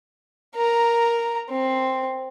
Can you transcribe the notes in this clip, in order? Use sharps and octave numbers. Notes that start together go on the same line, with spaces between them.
A#4 A#5
C4